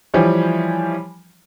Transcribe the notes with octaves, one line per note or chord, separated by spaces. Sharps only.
E3 F3 G3 G4 C#5